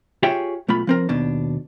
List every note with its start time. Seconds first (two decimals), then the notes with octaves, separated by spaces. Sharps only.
0.23 F4 G4 G#4 C#5 E5 G5
0.68 B1 A3 F4 B5
0.87 F3 C4 A#4
1.09 D#2 B2 D4